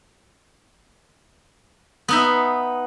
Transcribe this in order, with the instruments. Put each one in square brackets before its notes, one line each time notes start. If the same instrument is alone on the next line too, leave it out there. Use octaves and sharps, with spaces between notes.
[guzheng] B3 D#4 E5